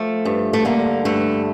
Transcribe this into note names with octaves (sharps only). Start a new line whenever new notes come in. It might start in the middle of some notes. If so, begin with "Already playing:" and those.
Already playing: F3 A3
G2
A3
D3 A#3
G2 A3